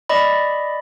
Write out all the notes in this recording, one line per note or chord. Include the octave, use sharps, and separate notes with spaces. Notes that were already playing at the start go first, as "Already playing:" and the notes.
D5 D#5 B5